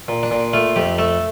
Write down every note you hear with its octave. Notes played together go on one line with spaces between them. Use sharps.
A#2
D4
A#2
A3 F4
F2 G4
A3 A4